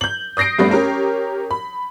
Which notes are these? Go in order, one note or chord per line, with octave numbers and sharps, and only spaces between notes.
G6 F#7
D#6 G6 A#6 C7 D7
G2 G3 A3 B3
C#4 G4 A#4 C#5
B5